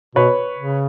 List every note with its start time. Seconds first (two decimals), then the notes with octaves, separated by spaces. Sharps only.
0.15 B2 B4 C#5
0.58 C#3